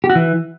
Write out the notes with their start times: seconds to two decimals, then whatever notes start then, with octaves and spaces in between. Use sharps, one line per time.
0.04 G4
0.10 F#4
0.15 E3